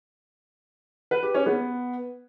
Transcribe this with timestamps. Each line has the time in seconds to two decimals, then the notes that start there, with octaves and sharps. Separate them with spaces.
1.11 B4
1.23 G4
1.34 C#4
1.46 B3